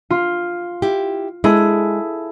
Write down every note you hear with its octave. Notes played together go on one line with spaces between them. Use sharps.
F4
E4 G4
G#3 E4 G#4 A4